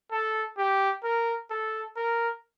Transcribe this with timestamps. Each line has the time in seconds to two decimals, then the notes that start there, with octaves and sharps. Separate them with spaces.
0.12 A4
0.58 G4
1.04 A#4
1.51 A4
1.97 A#4